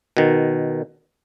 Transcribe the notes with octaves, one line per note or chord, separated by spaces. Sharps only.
B2 D#3